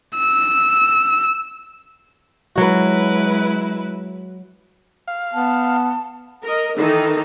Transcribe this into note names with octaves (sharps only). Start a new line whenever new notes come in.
E6
F#3 G#3 E4 F#4 B4
F5
B3 A5
A#4 D#5
D#3 E3 D#4 A4